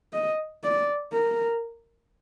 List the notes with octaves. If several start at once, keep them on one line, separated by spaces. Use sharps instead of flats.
D#5
D5
A#4